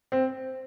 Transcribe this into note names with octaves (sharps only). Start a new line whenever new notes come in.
C4